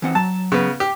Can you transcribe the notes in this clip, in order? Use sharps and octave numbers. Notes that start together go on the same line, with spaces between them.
E3 C4 F#5
F#3 A5
C#3 B3
G4